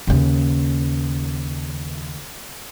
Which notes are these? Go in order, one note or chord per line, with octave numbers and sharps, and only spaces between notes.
D#2 C#3